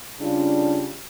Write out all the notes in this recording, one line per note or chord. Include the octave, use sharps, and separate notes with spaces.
C#3 G3 D4 F4